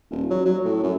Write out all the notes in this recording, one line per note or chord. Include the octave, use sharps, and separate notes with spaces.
D#1
F#3
F#3
A2
F#2